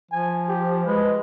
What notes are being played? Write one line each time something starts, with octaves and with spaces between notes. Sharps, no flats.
F3 G#5
G4
G#3 B4